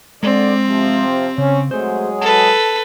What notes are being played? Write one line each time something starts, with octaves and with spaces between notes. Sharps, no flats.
D3 G#3 C4 D5
C3 F3
C#3 C#4
F#3 G#3 A3 G#4 C5
A4 B4 A5